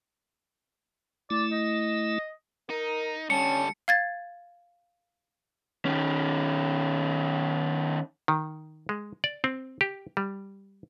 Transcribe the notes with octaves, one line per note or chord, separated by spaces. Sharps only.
A3 E4 D5
D#5
D#4 A#4
D3 G3 C#4 A5 C#7
F5 G#6 A6
D#3 C#4
D#3
G#3
D5
C4
G4
G3